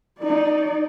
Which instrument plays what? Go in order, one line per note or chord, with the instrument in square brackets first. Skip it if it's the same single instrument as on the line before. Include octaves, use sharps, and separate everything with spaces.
[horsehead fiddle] D#4 D5